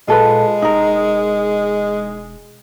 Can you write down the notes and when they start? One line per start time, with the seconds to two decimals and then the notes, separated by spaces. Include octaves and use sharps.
0.08 A#2 G#3 F4 A4 B4
0.62 E1 D#4 A#4